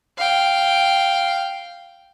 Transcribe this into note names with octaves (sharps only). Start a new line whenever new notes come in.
F5 G5